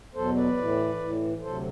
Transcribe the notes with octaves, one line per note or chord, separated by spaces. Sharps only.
E2 B2 F#3 A4 C5
B4 D5
A2 E3
A2 E3
D2 C3 F#3 A4 C5